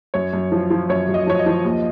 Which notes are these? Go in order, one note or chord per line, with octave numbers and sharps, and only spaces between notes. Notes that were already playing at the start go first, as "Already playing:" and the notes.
F#2 C#5
F#2
F3
F3
F#2 C#5
F#2
D#5
F3 C#5
D#5
F3
D#2